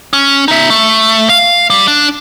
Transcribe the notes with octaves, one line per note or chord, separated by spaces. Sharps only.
C#4
D#4 E5
A3
F5
G3
D4